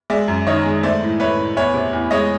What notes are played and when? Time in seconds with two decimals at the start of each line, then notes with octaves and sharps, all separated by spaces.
0.10 G#3 D5 E5
0.28 F#2
0.46 D#3 C#5 D#5
0.66 G#3
0.83 A3 C5 D5
1.02 A2
1.20 A3 B4 C#5
1.37 A2
1.56 E2 B4 C#5
1.74 C3
1.93 E2
2.11 G#3 C#5 D#5